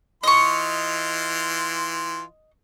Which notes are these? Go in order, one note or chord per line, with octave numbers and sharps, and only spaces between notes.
E3 F4 D#5 C6 C#6